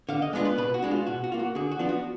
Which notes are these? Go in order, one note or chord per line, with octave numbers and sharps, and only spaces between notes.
D3 F5
D#5
G#3 B3 D4 F4
B4
B2 B4
F#4
G#3 D4
F4
B2 F#4
F#4
A#3 F4
F#4
D3 G#4
F#4
F3 B3 D4 F4
F#4